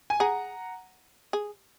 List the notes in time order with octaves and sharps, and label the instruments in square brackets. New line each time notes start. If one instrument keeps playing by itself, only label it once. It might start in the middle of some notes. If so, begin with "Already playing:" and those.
[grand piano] G#5
[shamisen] G#4 [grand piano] F#5 A#5
[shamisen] G#4